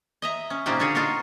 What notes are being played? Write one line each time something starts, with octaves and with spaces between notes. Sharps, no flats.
D#5 E5 A#5
C#4
A#2 C#3 A#3 C4 D#4 G4
D3 C#4 F#4 G#4 C#5
D#4 F4 F#4 A4 A#4 F5